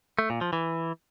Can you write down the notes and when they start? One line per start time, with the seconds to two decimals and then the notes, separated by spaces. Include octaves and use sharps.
0.19 A3
0.30 A#2
0.41 F3
0.53 E3